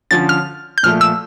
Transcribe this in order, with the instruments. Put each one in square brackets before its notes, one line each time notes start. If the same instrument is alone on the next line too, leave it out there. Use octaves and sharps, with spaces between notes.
[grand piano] D3 F3 C#4 [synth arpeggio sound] A6
[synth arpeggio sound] F6
G6
[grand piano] A#2 F3 A3 [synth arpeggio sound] F6
[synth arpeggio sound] E6